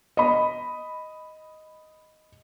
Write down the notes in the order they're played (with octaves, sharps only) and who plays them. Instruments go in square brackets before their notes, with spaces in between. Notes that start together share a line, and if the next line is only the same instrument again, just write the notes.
[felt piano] D#5 B5